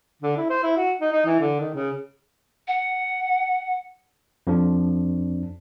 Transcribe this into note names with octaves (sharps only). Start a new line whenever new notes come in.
D3
E4
C5
E4
F#4
D#4
D#4
E3
D3
D#3
C#3
F#5
F2 F3 D4